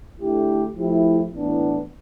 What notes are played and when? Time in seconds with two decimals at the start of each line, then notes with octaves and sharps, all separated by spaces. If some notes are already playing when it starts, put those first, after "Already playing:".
0.17 D3 A3 E4 G4
0.75 F3 A3 E4 G4
1.31 A2 E3 B3 D4